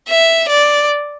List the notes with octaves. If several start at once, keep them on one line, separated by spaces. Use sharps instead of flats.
E5
D5